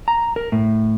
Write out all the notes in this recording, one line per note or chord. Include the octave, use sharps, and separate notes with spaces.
A#5
A#4
A2